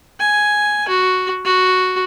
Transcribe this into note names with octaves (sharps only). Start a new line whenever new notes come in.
G#5
F#4
F#4